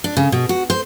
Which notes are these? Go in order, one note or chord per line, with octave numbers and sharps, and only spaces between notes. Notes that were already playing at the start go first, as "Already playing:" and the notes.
D4
C#3
B2
F#4
C5